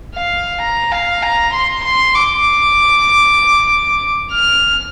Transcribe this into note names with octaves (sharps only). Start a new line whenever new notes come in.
F5
A#5
F5
A#5
C6
C6
D6
F6